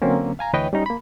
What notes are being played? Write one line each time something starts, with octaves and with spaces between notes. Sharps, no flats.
D3 F#3 A#3 C4 C#4
F5 G#5 A#5
D2 E3 B4 C#5 D#5 G5
G3 C#4 D#4
A#3 B5